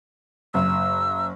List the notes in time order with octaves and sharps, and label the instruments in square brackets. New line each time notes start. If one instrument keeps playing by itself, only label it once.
[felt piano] F#1 [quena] E6